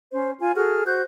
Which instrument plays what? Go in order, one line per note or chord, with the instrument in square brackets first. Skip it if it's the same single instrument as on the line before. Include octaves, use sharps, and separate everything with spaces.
[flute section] C#4 C5
F4 G#5
F#4 G#4 A4 F6
F#4 C5 F#6 G6